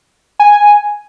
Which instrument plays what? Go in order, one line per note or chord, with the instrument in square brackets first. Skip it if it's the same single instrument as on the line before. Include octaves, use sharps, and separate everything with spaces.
[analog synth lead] G#5